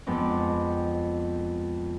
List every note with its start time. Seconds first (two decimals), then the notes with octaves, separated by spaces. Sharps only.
0.07 F2 G#3 B3 C4 D6